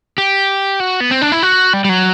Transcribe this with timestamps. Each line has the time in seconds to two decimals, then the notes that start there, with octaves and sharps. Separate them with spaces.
0.18 G4
0.80 F#4
1.00 B3
1.11 C4
1.22 D4
1.32 E4
1.43 F#4
1.73 G3
1.85 G3
1.89 F#3